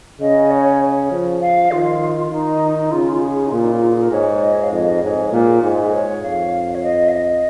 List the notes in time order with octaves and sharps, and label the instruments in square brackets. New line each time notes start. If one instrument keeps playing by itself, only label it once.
[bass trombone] C#3 [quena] D#5
[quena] C#5
[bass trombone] F3
[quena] F5
[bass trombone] D#3 [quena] F4
[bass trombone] D#3 [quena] D#4
[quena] D#4
[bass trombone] C#3 [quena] F4
[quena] F4
G#4
D#4
[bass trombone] A#2 [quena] F4
[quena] D#4
F4
F4
G#4
A#4
[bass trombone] G#2 [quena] C#5
[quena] D#5
C#5
F5
[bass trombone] F2 [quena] D#5
[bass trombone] G#2 [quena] C#5
[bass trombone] A#2 [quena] G#4
[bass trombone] G#2 [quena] F4
[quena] F4
G#4
C#5
[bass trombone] F2 [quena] F5
[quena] C#5
D#5
F5
D#5